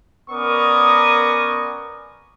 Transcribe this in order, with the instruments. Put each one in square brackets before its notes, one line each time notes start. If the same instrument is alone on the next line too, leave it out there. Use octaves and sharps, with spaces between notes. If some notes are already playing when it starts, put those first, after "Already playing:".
[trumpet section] B3 C#4 A#4 D5 C#6 D#6